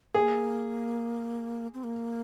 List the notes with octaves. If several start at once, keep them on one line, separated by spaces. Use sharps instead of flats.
A#3 G#4
C4
A#3